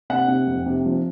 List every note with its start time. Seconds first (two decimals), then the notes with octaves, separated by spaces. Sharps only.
0.10 C3 F#5
0.28 C3
0.47 F2
0.66 C3
0.86 F3